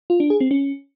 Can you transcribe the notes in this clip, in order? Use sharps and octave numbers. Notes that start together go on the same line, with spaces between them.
F4
D4
G#4
C4
C#4